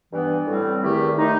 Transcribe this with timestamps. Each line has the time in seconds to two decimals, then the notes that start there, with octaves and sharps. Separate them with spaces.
0.11 G2 E3 B3
0.47 A2 G3 C4
0.83 E2 D#3 A3 E4 G4
1.18 D#3 A3 D#4